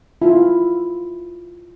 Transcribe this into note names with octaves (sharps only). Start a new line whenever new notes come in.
E4 F4